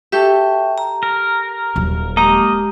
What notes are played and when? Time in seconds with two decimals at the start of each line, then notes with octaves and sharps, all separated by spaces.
0.12 G4 A4 E5 G5 C#6
0.78 A#5
1.03 A#4
1.76 D#1 F#3
2.17 G#3 A#3 G4 D#5 A#5